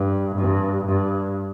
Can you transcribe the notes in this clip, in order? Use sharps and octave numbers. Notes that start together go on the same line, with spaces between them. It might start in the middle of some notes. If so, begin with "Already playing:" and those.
Already playing: G2
G2
G2